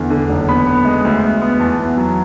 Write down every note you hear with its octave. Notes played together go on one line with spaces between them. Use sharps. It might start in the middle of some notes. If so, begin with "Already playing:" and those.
Already playing: E2 D3
D3
F#1
B3 B5
B3
G#3
D2
D2
B3
E2 A5
E2
F#3